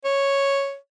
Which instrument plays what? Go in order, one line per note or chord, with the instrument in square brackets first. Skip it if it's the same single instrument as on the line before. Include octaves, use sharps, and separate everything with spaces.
[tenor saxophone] C#5